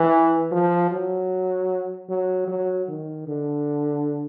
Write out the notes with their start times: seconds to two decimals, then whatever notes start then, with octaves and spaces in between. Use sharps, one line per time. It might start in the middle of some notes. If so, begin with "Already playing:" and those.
Already playing: E3
0.52 F3
0.91 F#3
2.09 F#3
2.48 F#3
2.88 D#3
3.28 D3